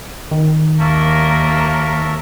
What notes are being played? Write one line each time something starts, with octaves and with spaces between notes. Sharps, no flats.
D#3
D#2 A#3 A#4 E5 A5 C#6